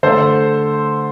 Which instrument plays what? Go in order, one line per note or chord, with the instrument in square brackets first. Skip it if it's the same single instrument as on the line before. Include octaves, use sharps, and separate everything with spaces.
[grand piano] D3 A3 A4 C5